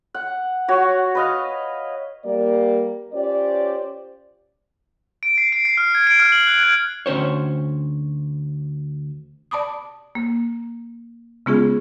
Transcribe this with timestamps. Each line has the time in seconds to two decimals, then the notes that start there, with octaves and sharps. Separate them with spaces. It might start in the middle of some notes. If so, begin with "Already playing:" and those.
0.14 F#5
0.68 F#4 C#5
1.15 B4 D#5 F5
2.24 G3 A#3 D5
3.13 C#4 F4 G4 C5 D5
5.23 D7
5.38 C7
5.52 D7
5.65 C7
5.77 F6
5.95 G#6
6.07 D7
6.20 F6
6.32 F#7
6.47 F#6
6.63 G#6
7.06 D2 C#4 C5 C#5
9.51 D5 A5 B5 D6 D#6
10.15 A#3
11.46 C#3 G#3 B3 C#4 F4 G#4